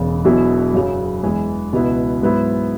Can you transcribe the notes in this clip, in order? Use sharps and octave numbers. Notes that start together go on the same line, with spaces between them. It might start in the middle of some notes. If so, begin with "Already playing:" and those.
Already playing: E1 E2 C#3
E1 E2 B2 F#3 E4
F#2 C#3 F#3
E2 E3 G#3
C#2 B2 B3 E4
G#2 F#3 B3 E4